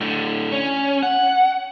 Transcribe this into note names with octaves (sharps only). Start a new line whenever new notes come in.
A2 D3
C#4
F#5